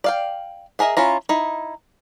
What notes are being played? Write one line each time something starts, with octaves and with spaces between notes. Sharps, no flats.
D5 F5 G5
B3 G#4 A#4 D#5 E5
C#4 E4 F4 A#5
D#4 E4